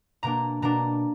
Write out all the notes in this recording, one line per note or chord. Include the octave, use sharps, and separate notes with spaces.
B2 A#3 D4 A#5
B2 A#3 D4 A#5